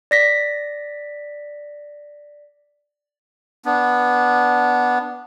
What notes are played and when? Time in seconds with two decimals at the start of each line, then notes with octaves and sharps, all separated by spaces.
0.11 D5 A#6 B6
3.65 B3 D4